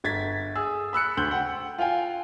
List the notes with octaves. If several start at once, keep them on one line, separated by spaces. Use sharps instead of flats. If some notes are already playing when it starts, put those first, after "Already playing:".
G1 G#6 A6 B6
G#4 E6
B5 E6 F#6 C#7
D2 C6 G6 F#7
F#5 G5
F4 F5 G5 G#5